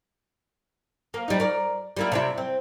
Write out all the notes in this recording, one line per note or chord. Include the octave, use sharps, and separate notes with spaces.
A#3
G3 D#4
A#4 D5
G3 A#3 E4
C3 D4 E4
C4